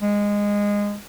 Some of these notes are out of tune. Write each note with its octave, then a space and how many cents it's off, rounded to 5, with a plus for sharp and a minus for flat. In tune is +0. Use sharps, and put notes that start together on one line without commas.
G#3 -15